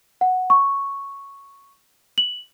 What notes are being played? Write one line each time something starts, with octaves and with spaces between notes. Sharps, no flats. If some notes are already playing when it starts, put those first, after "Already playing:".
F#5
C#6
F#7